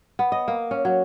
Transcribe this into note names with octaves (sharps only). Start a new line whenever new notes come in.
B3
D#5
A#3
C#4
F#3